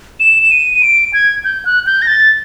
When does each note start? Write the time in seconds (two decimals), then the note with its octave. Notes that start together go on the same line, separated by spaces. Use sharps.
0.20 E7
0.43 E7
0.51 D#7
0.74 D#7
0.83 D7
1.13 G#6
1.44 G6
1.65 F#6
1.87 G6
2.02 A#6
2.07 A6